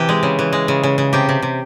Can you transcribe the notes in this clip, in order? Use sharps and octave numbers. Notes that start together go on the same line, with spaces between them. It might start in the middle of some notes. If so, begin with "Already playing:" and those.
Already playing: C3 E3 G4
G#3
C#3
E3
G#3
C#3
C#3
C#3
C3 G4
C3
C3